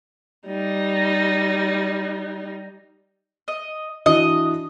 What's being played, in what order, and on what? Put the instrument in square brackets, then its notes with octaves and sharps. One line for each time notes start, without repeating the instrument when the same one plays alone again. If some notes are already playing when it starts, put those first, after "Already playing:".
[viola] G3 D#4
[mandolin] D#5
[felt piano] E3 D4 F#4 [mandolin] D#5